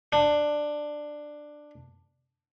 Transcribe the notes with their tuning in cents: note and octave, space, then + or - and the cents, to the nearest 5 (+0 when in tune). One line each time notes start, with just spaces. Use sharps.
D4 +10